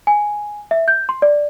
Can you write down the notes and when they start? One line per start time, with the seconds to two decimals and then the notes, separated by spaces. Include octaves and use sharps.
0.07 G#5
0.71 E5
0.88 G6
1.09 C6
1.22 D5